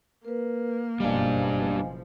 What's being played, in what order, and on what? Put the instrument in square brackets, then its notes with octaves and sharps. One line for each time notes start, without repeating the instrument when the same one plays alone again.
[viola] A#3 [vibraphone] A#4 B4
[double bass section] F#1 B2 F3 [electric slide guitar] G3 D4 [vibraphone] D#5 F5 G#5